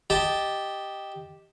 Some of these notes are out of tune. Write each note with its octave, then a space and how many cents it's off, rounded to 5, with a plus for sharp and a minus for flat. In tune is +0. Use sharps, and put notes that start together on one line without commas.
G4 +0 D#5 +0 A5 -5